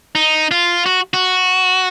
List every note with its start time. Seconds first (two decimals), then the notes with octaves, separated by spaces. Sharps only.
0.15 D#4
0.51 F4
0.86 F#4
1.14 F#4